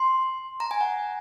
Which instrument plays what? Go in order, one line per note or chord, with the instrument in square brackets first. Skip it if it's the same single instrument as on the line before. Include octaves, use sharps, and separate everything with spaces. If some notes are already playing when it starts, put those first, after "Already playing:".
Already playing: [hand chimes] C6
A#5
G#5
F#5